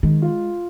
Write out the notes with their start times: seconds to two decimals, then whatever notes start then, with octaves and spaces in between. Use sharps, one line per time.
0.03 D#3 G#3
0.22 F4